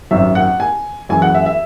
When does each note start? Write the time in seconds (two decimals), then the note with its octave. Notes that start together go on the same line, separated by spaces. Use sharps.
0.11 G#1 F#2 D#3 E5
0.35 F#5
0.60 G#5
1.09 F#2 E3 G#3 G#5
1.22 F#5
1.35 E5
1.46 E5